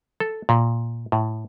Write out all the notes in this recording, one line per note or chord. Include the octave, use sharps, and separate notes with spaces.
A4
A#2
A2